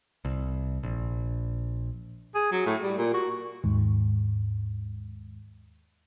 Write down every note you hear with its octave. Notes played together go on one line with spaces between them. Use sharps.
C2
A#1
G#4
F#3
A2
G3
A#2
F#4
D#2 G#2